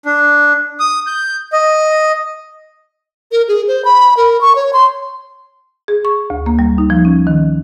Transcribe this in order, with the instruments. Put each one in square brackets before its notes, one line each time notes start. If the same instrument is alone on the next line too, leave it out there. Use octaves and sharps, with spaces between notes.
[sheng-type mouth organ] D4
D#6
G6
D#5
[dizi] A#4
G#4
C5
B5
A#4
C#6
C#5
C6
[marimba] G#4
C#6
D2
A#3
G3
D#4
F3
C#4
D#3